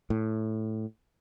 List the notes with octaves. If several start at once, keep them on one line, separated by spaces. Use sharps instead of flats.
A2